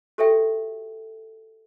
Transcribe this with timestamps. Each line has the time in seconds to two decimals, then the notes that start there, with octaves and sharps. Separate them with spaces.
0.18 F#4 G4 A4 C#5 E5 G5